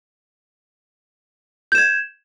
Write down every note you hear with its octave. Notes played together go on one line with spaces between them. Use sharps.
G6 G#6 E7